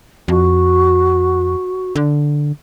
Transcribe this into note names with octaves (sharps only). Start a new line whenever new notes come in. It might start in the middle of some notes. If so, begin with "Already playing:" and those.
F2 F#4
D3